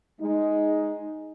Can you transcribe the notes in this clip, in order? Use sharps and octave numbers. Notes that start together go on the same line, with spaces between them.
G#3 D#4